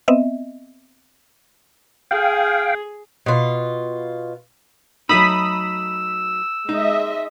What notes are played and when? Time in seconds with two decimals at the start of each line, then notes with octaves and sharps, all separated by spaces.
0.08 B3 C4 D#5 E5
2.11 G#4 F5 G5
3.26 B2 F4
5.09 F#3 A3 D#4 B5 D#6 E6 B6
6.69 G#3 D#4 D#5 E5